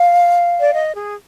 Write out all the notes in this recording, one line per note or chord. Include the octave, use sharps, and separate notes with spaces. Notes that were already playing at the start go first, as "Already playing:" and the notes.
Already playing: F5
D5
D#5
G#4